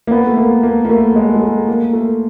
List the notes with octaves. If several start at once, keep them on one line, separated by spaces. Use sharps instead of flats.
A#3
B3
A3
A#3
A#3
A#3
A3
G#3
G#3
A3
A#3
A3